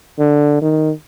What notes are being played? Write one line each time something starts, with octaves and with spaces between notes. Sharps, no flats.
D3
D#3